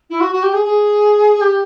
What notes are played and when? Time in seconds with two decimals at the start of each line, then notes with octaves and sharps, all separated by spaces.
0.09 E4
0.20 F#4
0.32 F#4
0.42 G4
0.53 G#4
0.64 G#4
1.41 G4